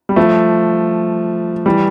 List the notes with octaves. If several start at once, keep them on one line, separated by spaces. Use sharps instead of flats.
G3
F3 A3
E3 G3